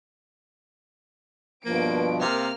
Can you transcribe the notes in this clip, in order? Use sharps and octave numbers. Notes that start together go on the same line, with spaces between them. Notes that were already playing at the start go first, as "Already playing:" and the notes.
G2 B2 F3 A#3 D7
C3 A#3 F6